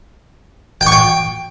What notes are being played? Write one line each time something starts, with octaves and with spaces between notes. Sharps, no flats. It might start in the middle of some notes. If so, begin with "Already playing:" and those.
G5
C#6
G5